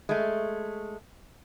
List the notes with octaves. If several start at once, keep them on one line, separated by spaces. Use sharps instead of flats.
G#3 A3